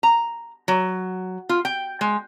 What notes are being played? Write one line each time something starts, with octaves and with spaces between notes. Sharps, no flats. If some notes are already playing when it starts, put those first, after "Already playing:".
A#5
F#3
F4
G5
G#3